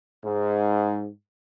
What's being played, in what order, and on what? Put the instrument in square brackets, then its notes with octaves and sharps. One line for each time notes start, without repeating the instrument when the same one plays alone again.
[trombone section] G#2